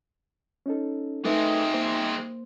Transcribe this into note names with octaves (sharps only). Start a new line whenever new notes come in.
C#4 D#4 A4
G#3 A3 C4 D#4 A4 B4 E5
A#3 C5